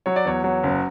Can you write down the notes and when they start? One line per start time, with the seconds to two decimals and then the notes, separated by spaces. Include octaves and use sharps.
0.06 F#3 C#5
0.16 D5
0.25 E2 C#5
0.44 F#3 C#5
0.63 F#1